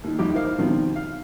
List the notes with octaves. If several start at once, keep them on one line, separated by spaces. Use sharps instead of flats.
D#2 D#4
F2 D#4 E4 F#4 G4 D6
D#4 E4 A#4 C5 F5
B2 D#3 F3 G3 C4
F5